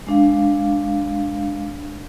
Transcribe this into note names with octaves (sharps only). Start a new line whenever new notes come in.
G#3 D4 F5